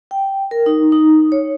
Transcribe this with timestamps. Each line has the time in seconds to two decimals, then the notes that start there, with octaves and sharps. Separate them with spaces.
0.11 G5
0.51 A#4
0.66 D#4
0.92 D#4
1.32 C#5